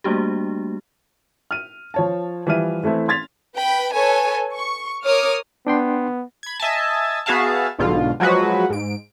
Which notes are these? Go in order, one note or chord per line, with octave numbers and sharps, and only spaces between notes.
G3 A3 A#3 D4 F#4 G4
F6 D#7
F3 C#5 A5
E3 F3 G3 E5 F6 D#7
E3 A3 C4 E4
C6 G#6 A6 B6 F7
B4 G5 B5
A4 B4 C#5 G#5
C#6
A#4 C#5 D6 D#6 F6
B3 D4 G5 C6
B5 G#6
D#5 E5 G#5 A5
B3 F#4 G#4 E5 F5 A5
B1 G#2 B2 D3 F4
F3 F#3 G#3 F#4 B4
G#2 D7